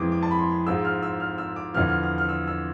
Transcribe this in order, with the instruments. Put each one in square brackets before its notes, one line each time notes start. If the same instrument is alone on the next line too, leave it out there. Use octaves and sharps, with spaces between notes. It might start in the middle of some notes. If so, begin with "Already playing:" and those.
Already playing: [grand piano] F2 E3 G#3 D6
D6
A5
B5
C6
G#2 F3 G#3 E6
F6
E6
F6
E6
D6
E2 D3 F3 F6
F6
F6
F6
E6
E6